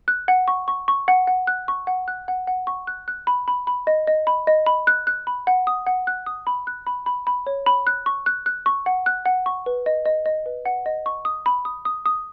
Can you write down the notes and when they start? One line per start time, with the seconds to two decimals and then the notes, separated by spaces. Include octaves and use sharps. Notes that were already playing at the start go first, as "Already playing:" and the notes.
0.08 F#6
0.28 F#5
0.48 C#6
0.68 C#6
0.88 C#6
1.08 F#5
1.27 F#5
1.47 F#6
1.68 C#6
1.87 F#5
2.08 F#6
2.28 F#5
2.47 F#5
2.67 C#6
2.87 F#6
3.08 F#6
3.27 B5
3.48 B5
3.67 B5
3.87 D#5
4.07 D#5
4.27 B5
4.47 D#5
4.66 B5
4.87 F#6
5.07 F#6
5.27 B5
5.47 F#5
5.67 D#6
5.86 F#5
6.07 F#6
6.26 D#6
6.47 B5
6.67 F#6
6.87 B5
7.06 B5
7.27 B5
7.47 C#5
7.66 B5
7.87 F#6
8.06 C#6
8.26 F#6
8.46 F#6
8.66 C#6
8.86 F#5
9.06 F#6
9.26 F#5
9.46 C#6
9.66 B4
9.86 D#5
10.06 D#5
10.26 D#5
10.46 B4
10.65 F#5
10.86 D#5
11.06 C#6
11.25 D#6
11.46 B5
11.65 D#6
11.85 D#6
12.06 D#6